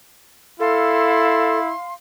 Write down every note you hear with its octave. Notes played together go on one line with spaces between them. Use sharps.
E4 A4 F5 C6